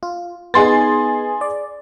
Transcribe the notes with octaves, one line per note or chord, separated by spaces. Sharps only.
F4
B3 D#4 G#4 C6 A6
D5